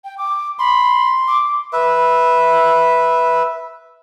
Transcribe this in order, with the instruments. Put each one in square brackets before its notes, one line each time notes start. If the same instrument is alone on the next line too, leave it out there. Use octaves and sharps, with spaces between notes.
[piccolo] G5
D6
[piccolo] B5 [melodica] C6
[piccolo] D6
[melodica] B4 E5